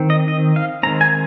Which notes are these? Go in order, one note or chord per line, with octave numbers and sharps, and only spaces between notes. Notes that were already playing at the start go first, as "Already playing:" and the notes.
Already playing: D#3 C4
D#5
D#5
F5
D#3 G#3 C4 A#5
G#5